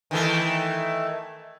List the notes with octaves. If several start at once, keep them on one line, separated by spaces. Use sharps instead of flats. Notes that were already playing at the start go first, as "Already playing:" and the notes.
D#3 E3 A3